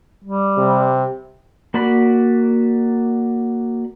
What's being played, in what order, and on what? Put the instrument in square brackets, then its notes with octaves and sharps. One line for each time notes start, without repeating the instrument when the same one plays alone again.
[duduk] G3
[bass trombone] C3
[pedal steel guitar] A#3 F#4 D5 B5